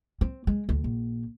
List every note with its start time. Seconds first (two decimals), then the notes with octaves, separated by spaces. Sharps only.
0.21 C4
0.47 G#3
0.69 D2
0.84 A#1